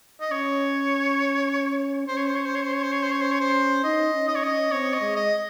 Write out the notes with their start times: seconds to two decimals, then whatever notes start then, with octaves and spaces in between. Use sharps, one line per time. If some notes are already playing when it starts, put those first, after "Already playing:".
0.21 D#5
0.31 C#4 C#5
2.08 C#4 C5
2.17 C#5
2.27 C5
2.37 C#5
2.46 C5
2.56 C#5
2.65 C5
2.75 C#5
2.84 C5
2.93 C#5
3.03 C5
3.12 C#5
3.22 C5
3.32 C#5
3.41 C5
3.84 D#4 D#5
4.14 C#4
4.28 D#5
4.36 C#5
4.43 C#4 D#5
4.72 C4 C#5
4.94 D#5
5.01 G#3
5.16 D#5